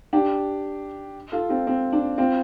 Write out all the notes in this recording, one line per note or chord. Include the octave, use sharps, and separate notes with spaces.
D4 G4
F4 A4
C4 F4
C4
D4
C4 F4